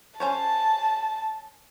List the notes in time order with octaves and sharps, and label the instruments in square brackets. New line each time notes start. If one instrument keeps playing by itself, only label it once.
[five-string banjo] C#4 C5 C#5 [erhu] A5